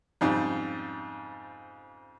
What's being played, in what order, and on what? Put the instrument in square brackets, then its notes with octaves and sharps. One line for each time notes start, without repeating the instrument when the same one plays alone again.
[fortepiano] F2 G#2 C#3 G3